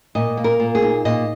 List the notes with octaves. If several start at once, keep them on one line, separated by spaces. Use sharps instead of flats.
A#2 D#5
A#3
A#4
A#2
G#4
D#4
A#2 D#5